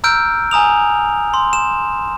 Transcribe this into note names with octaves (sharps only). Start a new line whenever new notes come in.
A#5 E6 F6 G6 D7
G#5 A#5 D#6 F7
C6
E7